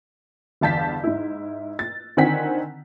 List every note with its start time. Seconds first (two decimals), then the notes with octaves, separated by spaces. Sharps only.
0.61 G1 E2 F5 A5 G6 B6
1.04 G#2 E4
1.79 A6
2.17 D3 D#3 C4 F#5 G#5 B6